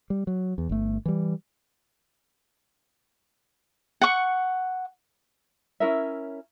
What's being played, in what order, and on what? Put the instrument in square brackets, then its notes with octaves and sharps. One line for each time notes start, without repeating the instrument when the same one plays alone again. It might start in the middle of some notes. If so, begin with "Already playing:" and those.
[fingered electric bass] G3
F#3
E2
G1 A3
E3 G3
[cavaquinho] F#5 C#6
[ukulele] C#4 E4 A#4 E5